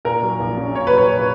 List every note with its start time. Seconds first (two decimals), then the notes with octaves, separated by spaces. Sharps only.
0.05 A#2 A#4
0.23 F#3
0.40 A#1
0.57 C#4
0.75 A#2 C#5
0.87 B4
0.92 F#3
0.98 C#5